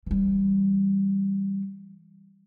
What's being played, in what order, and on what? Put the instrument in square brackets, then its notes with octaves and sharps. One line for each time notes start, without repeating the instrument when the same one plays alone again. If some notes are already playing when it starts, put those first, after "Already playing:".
[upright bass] E3 G3